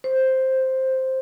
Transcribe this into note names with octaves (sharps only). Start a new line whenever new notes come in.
C5